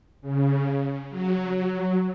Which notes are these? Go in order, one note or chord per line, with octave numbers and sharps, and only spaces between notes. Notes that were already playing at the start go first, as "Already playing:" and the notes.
C#3
F#3
F#3